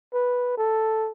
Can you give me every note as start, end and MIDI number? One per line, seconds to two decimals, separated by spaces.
0.14 0.56 71
0.57 1.11 69